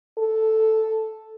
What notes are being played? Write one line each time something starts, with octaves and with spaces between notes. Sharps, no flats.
A4